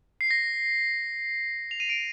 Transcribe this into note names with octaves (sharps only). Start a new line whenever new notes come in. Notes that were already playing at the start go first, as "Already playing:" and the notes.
C7
A#6
F7
D#7
D7